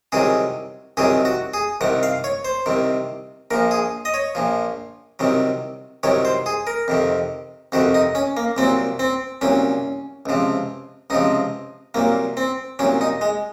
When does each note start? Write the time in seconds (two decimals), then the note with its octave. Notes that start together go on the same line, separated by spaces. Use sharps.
0.12 C2 C3 D#3 F#3 G#4
0.97 C2 C3 D#3 F#3 G#4
1.25 F#4
1.54 G#4
1.81 C2 C3 D#3 F#5
2.03 F5
2.24 C#5
2.45 C5
2.66 C2 C3 D#3
3.51 A#1 A#2 F3 A#4
3.71 G#4
4.05 D#5
4.14 C#5
4.35 A#1 A#2 F3
5.19 C2 C3 D#3 F#3
6.03 C2 C3 D#3 F#3 C#5
6.25 C5
6.46 G#4
6.67 A#4
6.88 F2 C3 D#3
7.72 F2 C3 D#3 F#4
7.94 D#4
8.15 C#4
8.37 A#3
8.57 C2 A#2 F#3 C4
8.99 C4
9.41 C2 A#2 F#3 C#4
10.26 C#2 C3 F3
11.10 C#2 C3 F3 D#4
11.94 C2 A#2 F#3 A#3
12.37 C4
12.79 C2 A#2 F#3 C#4
13.01 D#4
13.21 G#3